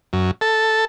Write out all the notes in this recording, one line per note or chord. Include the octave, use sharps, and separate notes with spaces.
F#2
A4